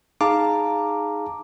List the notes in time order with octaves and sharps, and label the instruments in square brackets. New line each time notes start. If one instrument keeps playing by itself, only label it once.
[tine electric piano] D#4 G#4 F5 A5 A#5 D6